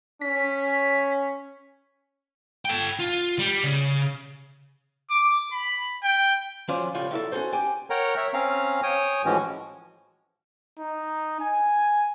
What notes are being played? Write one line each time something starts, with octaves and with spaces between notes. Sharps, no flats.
C#4 B6
A4 G5
F4
G3
C#3
D6
B5
G5
F3 F#3 C#4 F4 C5 D5
C#2 A2 G3 F4 C#5
F#3 E4 A4
C#4 D#4 F#4 A4 C5
G4 G5 G#5
A#4 C#5 F#5 G5 A#5
C#5 E5
C4 C#4 F5 A#5
C#5 G5 G#5 D#6
A2 E3 F3 G#3 C#4 F#4
D#4
G#5